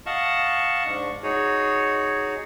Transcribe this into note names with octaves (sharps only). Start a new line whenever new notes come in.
D#5 F5 F#5 A5 C#6
G#2 D4 C#6
D#4 F#4 G#4 C#5